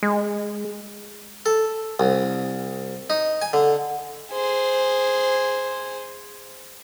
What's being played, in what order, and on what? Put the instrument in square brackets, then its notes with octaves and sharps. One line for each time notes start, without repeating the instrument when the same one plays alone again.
[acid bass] G#3
[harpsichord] A4
C2
D#4
G#5
D3
[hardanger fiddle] G#4 C5